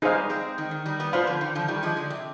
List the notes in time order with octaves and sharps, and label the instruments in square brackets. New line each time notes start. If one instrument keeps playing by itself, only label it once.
[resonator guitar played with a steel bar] G3 B3 [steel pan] D#4 G#4 C5 F5
[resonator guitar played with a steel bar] G#3 C4
D#3
D#3
D#3 G3
G3 B3
[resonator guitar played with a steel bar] B3 D4 [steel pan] F4 C5 F5 B5
[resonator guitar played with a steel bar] D3 F3
D#3
D3 F3
D#3 G3
F3 G#3
D3
C3